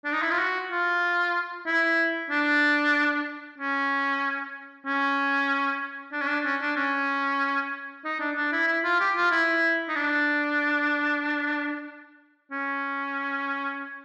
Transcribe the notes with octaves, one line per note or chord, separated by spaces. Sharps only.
D4
D#4
E4
F4
F#4
F4
E4
D4
C#4
C#4
D4
C#4
D4
C#4
D4
C#4
D#4
D4
D4
E4
E4
F4
G4
F4
E4
D#4
D4
C#4